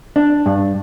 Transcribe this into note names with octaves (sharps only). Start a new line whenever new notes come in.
D4
G2